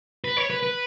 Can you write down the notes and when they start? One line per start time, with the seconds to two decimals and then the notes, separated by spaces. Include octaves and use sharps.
0.24 B4
0.37 C#5
0.50 B4
0.63 B4